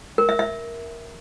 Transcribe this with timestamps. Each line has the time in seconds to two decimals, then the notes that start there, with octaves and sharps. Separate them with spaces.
0.18 A#4
0.29 E5
0.39 E5